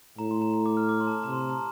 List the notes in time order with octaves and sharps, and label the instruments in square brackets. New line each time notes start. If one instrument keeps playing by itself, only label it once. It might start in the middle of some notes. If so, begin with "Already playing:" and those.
[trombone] A2 [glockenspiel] A#5
[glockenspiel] C6
A#5
A#5
D6
F6
D6
C6
A5
A#5
[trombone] C3 [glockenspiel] A#5
[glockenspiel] C6
A#5
A5